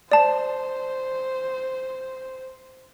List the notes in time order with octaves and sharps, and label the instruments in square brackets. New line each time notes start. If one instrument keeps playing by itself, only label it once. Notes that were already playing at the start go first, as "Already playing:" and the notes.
[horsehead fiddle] C5 [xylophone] D5 A5